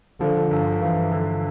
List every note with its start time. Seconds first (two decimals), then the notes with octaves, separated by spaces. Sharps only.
0.20 D3 F3
0.51 G1
0.81 G1 E3
1.11 D3